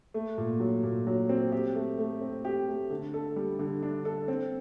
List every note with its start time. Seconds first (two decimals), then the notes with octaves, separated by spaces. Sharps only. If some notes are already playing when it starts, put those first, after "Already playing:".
0.14 A3
0.38 A#2
0.60 F#3
0.84 A#2
1.07 F#3
1.29 C4
1.52 G4
1.75 A3
1.99 A3
2.21 C4
2.45 G4
2.68 A3
2.90 D3
3.14 A4
3.36 G3
3.59 D3
3.82 D4
4.05 A4
4.28 C4